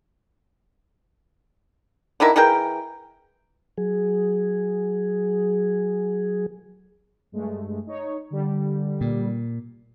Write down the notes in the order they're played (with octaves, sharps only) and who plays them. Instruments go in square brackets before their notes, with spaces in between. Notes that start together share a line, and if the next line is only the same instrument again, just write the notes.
[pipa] D3 D#3 E4 A#4
E3 G#4 A#4 G5
[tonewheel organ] F#3 G#4
[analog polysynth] G2 G#3 A3
D#4 C#5
D3 G3
[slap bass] A#2